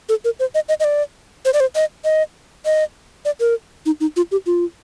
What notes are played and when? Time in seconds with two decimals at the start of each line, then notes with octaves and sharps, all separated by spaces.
0.09 A4
0.25 A#4
0.39 C5
0.55 D#5
0.69 D#5
0.80 D#5
0.84 D5
1.45 C5
1.54 D5
1.60 C5
1.75 D#5
2.05 D#5
2.65 D#5
3.25 D5
3.40 A#4
3.86 D#4
4.00 D#4
4.16 F4
4.32 G4
4.46 F4